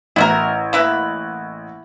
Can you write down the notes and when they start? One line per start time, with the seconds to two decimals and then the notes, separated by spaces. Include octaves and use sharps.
0.16 A1 E4 F#4 A#4
0.73 A#3 E4 B4